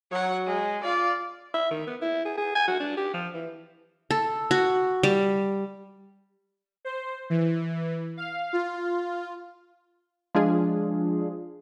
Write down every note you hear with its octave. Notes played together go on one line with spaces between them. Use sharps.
F#3 C#5 F#5
G#3
F4 D5 F5
E5
D#3
B3
E4
G#4
G#4
G#5
F#4
D4
G4
F3
E3
A4
F#4
G3
C5
E3
F5
F4
F3 G#3 D4 F4 G#4